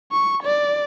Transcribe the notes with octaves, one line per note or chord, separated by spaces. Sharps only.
C#6
D5